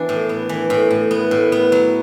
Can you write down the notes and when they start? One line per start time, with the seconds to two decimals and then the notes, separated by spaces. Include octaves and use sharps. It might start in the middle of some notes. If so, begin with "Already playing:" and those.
Already playing: E3 B3 D4
0.09 A2
0.29 B3
0.49 E3
0.70 A2
0.91 A2
1.11 B3
1.31 A2
1.52 B3
1.72 F#3